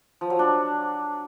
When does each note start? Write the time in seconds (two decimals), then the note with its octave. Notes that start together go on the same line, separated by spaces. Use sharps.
0.21 F3
0.30 F#3
0.39 D4